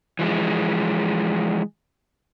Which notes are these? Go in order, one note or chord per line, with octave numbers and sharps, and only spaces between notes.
E3 F3 G#3